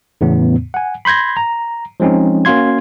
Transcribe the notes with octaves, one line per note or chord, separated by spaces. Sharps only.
E2 A2 C#3 B3
F#5 G#5
B5 C6 G6 G#6 A#6
A#5
F3 G#3 C4 C#4 D#4
A#3 C#4 F#4 F5 C6 G#6